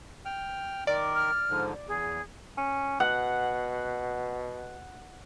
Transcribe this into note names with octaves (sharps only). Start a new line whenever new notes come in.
G5 F6
D#3 A#4 D5
F6
G#2 D3 F3
E2 G#4
C#4
B2 F#5